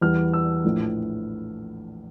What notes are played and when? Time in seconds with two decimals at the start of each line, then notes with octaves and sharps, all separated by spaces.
0.01 E2 E3 G3 F6
0.33 E6
0.64 A#1 A2 E3 A3